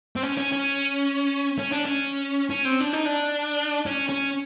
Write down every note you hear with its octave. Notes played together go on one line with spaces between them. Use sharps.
C4
C#4
C#4
C#4
C#4
D4
C#4
C#4
C4
D4
D#4
D4
C#4
C#4